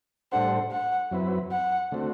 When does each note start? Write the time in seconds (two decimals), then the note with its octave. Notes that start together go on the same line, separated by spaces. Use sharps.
0.32 A2 G3 D4 A4 C5 F#5
0.72 F#5
1.11 F#2 F#3 C4 E4 B4
1.52 F#5
1.92 D3 A3 C4 F#4